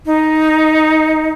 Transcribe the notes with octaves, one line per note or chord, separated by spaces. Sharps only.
D#4